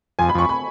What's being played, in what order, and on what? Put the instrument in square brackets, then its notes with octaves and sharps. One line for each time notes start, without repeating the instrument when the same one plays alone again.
[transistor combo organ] F2 [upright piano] G#5
[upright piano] B5
[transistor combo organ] F2 [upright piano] C#6
[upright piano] B5